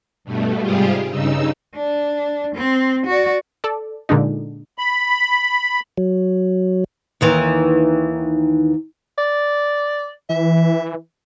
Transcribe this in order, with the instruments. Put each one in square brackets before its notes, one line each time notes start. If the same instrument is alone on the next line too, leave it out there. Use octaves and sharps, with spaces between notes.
[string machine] G2 B2 A3
G#2 C3 G3 F4 G4 G#4
G2 C#3 D#4 E6
[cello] D4
C4
F#4 D5
[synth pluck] A4 D5
A#2 D3 G#3 D4 D#4
[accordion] B5
[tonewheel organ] F#3
[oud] D#2 D#3 E3
[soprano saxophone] D5
[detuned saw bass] E3 [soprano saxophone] E5